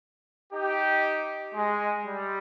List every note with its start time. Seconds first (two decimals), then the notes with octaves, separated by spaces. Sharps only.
0.51 D#4 G4
1.54 G#3
2.06 G3